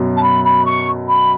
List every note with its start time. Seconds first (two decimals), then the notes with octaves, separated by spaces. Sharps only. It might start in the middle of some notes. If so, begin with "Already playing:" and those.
Already playing: F#2 B2
0.16 A5
0.22 B5
0.44 B5
0.65 C#6
1.09 B5